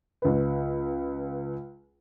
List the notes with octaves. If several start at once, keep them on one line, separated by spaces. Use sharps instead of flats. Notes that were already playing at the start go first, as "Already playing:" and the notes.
C#2 B4